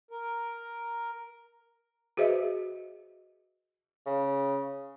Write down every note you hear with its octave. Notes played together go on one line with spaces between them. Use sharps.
A#4
F#4 G#4 B4 C5 D#5 E5
C#3